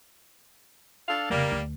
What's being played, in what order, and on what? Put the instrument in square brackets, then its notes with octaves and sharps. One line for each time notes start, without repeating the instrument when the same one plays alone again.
[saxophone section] D4 A4 F5
[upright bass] F1 C#3 [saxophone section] G3 A#3
[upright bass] D2